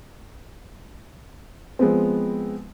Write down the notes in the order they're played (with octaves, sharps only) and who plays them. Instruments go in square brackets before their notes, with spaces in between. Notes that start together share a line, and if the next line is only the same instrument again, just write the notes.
[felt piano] F3 G#3 B3 C4